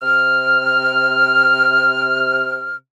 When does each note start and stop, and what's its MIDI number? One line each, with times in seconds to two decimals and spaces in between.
0.02 2.76 48
0.02 2.76 89